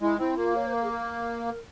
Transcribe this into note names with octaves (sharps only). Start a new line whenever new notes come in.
G#3 E4
C4 E4
A#3 F4
C#5
C5
A#4
G#4
A#4